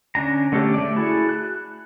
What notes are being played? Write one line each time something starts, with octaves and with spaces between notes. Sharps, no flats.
D3 C#4 D4 A#5
D3 A3 C#4 G4 A4
A3 D5
E4 F#4 G#4 A4
F#6